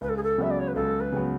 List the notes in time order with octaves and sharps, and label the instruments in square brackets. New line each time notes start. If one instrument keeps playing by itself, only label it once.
[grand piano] C#2 [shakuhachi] B4
[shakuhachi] A4
G#4
A4
[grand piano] C#3 F#3 B3 [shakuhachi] E5
[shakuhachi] D5
C#5
B4
[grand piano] C#2 [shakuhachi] A4
[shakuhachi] B4
[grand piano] C#3 F#3 B3